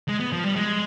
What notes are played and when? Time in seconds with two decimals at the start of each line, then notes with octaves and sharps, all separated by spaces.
0.08 G#3
0.20 B3
0.32 F3
0.44 G3
0.56 G#3